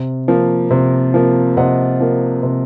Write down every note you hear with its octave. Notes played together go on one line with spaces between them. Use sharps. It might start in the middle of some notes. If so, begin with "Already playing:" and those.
Already playing: C3
F3 A#3
C3
F3 A#3
C3 D#5 F#5
F3 A#3
C3